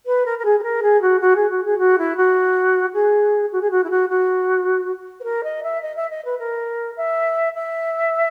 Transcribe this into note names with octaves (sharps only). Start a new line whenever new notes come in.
B4
A#4
A#4
G#4
G#4
A#4
G#4
F#4
F#4
G#4
F#4
G#4
F#4
E4
F#4
G#4
F#4
G#4
F#4
E4
F#4
F#4
B4
A#4
D#5
E5
D#5
E5
D#5
B4
A#4
E5
E5